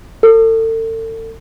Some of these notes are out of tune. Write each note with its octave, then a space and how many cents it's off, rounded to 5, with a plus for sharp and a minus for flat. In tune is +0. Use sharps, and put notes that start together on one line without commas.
A4 +35